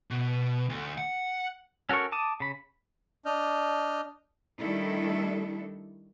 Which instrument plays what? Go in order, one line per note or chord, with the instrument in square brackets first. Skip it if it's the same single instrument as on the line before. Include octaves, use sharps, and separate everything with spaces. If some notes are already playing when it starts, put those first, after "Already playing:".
[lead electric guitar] B2
D2
F#5
[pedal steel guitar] C#4 F#4 A4 A#4 C#6
A5 D6 D#6
C#3 B5
[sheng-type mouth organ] D4 D#5 F6 G6
[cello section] D#3 G3 A3 D4 E4 A4